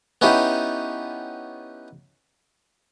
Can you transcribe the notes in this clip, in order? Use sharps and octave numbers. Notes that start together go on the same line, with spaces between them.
B3 C#4 D#4 E4 G4